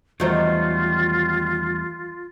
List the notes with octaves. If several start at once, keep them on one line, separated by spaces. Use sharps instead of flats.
E2 D#3 F#3 G3 A3 F4 C5